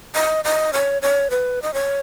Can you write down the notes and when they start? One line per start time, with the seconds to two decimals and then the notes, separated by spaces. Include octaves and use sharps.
0.15 D#5
0.45 D#5
0.73 C#5
1.02 C#5
1.31 B4
1.62 D#5
1.74 C#5